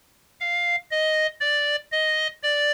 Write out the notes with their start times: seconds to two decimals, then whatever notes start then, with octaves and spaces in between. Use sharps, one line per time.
0.40 F5
0.91 D#5
1.41 D5
1.92 D#5
2.43 D5